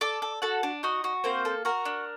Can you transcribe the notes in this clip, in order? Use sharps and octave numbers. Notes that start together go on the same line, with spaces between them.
A4 D5 D6
A4
F#4 A4 F#5
D4
D#4 F#4 D#5
F#4
A#3 C4 C5
A4
F#4 A#4
D4